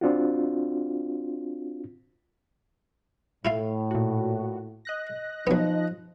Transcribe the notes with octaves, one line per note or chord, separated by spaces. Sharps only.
C4 D4 F4 F#4
A2 E4 F4 F5
A#2 F#4
D#5 F#6 A#6
F3 F#3 B3 D#4